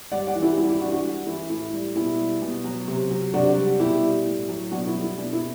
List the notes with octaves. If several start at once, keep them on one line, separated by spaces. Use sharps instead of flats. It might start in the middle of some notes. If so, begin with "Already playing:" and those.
G3 D5 F#5
D5 F#5
E3
E4 G4
G3 E4
E4 G4
E3 D4 F#4
D4 F#4
G3
E3 E4
A2 E4
G3
B2 E4
G3
B2
F#3
C3
F#3
C3 D4 F#4
G3
B2 E4 G4
G3
A2
F#3
B2 D4 F#4
E4
G3
E4
B2 D4
E4